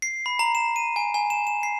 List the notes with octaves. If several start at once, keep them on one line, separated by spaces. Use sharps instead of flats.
C7
B5
A#5
E7
D#7
G#5
G#5
E7
E7
C7